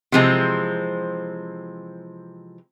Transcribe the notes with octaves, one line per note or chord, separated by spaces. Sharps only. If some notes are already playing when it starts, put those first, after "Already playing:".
C3 E3 F3 G#3 C4